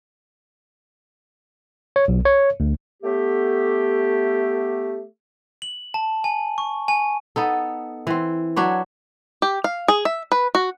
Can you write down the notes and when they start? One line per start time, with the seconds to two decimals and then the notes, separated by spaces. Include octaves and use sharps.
1.96 C#5
2.08 B1
2.25 C#5
2.60 D2
3.03 A3 B3 G4
5.62 F#7
5.94 A5
6.24 G#5
6.58 C#6
6.88 G#5
7.36 B3 D#4 A4
8.07 E3 C4
8.56 F#3 D4 B4 C#5
9.42 G4
9.64 F5
9.88 G#4
10.05 E5
10.32 B4
10.55 F#4